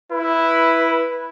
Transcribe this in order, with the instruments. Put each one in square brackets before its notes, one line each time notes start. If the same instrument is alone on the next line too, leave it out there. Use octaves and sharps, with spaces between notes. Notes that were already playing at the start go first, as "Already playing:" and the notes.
[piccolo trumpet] E4 [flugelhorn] B4